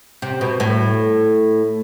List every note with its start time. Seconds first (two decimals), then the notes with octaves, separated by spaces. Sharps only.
0.22 C3
0.41 B2
0.60 A2